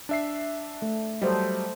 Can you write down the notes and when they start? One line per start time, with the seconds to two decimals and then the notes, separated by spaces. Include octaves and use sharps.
0.09 D4 E5 C7
0.82 A3
1.22 F#3 G3 A4 C5 D#5